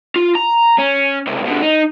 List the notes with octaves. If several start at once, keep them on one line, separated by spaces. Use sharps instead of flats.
F4
A#5
C#4
C#2 C3
B2 D3
D#4